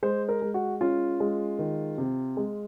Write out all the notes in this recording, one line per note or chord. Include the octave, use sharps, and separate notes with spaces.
G#3 C5
A#4
G#3
F#4
C#4 F4
G#3
D#3
C3
G#3